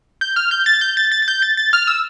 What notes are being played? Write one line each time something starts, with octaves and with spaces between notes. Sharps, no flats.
G6
F6
G6
A6
G6
A6
A6
A6
G6
A6
A6
F6
E6